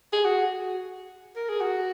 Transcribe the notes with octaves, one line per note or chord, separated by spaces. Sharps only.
G#4
F#4
A#4
G#4
F#4